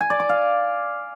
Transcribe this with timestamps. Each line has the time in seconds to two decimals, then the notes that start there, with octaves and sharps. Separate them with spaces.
0.01 G#5
0.10 D5
0.20 D6
0.29 F5